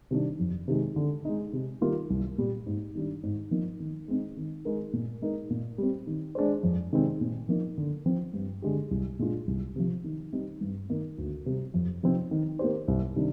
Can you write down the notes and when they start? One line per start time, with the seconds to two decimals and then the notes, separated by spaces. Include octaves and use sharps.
0.11 C3 D#3 G3 D4
0.39 F2
0.68 C3 D#3 G#3
0.96 D3
1.25 G#3 D#4
1.53 C3
1.81 D#3 G3 A#3 F4
2.10 C2
2.38 A#2 G3
2.66 G#2
2.95 D#3 G3 D4
3.23 G#2
3.51 F3 A#3 D#4
3.80 D#3
4.08 G#3 C4 D#4
4.37 D#3
4.65 G#3 D#4 A#4
4.93 A#2
5.22 G#3 D#4 A#4
5.50 A#2
5.78 G3 C4
6.07 D#3
6.35 G#3 D4 G#4 C5
6.63 F2
6.93 C3 D#3 G#3 C4
7.21 A#2
7.49 F3 A#3 D#4
7.78 D3
8.06 F3 C4
8.34 G2
8.62 D3 G#3 D4 G4
8.91 C2
9.19 A#2 G#3 D4 F4
9.47 C2
9.76 C3 F3
10.04 D#3
10.33 G3 C4 D#4
10.61 G2
10.89 D#3 A#3 D#4
11.18 D2
11.46 C3 G3
11.74 F2
12.03 C3 F3 C4 D#4
12.31 D#3
12.59 A#3 D#4 G4 C5
12.88 C2
13.16 C3 D#3 G3 D4